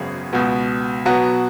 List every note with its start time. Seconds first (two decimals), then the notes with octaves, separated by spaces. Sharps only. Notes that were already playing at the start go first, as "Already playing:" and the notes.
Already playing: G#1 F#2 C#3 B3 G#4
0.33 C#2 B2 B3
1.05 B2 F#3 B3 F#4